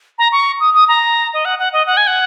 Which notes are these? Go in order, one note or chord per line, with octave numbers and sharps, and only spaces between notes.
A#5
C#6
D#6
D#6
A#5
D#5
F#5
F#5
D#5
F#5
G#5
F#5